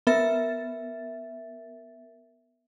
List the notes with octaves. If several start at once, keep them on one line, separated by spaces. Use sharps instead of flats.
B3 A#4 E5 A6